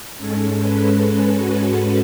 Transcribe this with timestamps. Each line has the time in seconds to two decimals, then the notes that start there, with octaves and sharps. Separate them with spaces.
0.17 G#2 G#3 C#4 A4
0.57 B4
0.97 A4
1.37 F#4